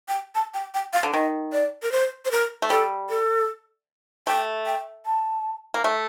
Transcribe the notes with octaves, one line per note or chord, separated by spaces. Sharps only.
G5
A5
G5
G5
F5
D3
D#3 D#5
D5
A#4
C5
C5
A#4
A3
G3 A4
A4
A3 G5
G5
A5
A#3
A3